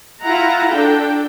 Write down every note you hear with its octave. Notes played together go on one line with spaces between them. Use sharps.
E4 F4 F#5 A#5
D4 A4 G5